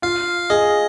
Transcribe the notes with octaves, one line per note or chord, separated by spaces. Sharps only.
F4 F5
G#4 D#5